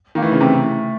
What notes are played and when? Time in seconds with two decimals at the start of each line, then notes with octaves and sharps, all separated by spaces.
0.15 D#3 A#3
0.22 E3 A3
0.32 C#3
0.40 C3